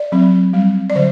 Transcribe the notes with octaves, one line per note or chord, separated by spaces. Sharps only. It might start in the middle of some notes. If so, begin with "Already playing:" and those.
Already playing: D5
F#3 C4
G3 C4
D5
D3 F#3 C5